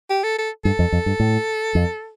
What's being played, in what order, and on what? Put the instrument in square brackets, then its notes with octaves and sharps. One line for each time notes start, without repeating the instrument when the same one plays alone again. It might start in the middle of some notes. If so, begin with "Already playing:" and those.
[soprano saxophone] G4
A4
A4
[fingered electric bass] G2 [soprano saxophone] A4
[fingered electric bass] F2
F2
G2
A2
F2